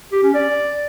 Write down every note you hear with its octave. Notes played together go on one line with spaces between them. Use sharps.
G4
C#4
D5